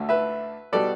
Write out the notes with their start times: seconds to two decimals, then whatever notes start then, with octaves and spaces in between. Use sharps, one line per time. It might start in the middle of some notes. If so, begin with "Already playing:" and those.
Already playing: D2 D3 A3
0.09 B4 E5
0.72 B2 G3 B3 A4 D5